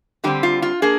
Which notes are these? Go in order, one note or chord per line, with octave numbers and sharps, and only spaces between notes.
D3 G3 C4 G4
F4
F4
A#3 D4 G#4